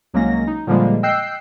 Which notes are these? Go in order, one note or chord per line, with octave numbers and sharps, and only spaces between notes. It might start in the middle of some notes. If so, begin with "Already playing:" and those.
C2 F#3 G#3 A#3 C#4 A#6
D#4
A#2 D3 F3 G3 G#3 A#3
D#5 G5 E6 F#6 G6 C7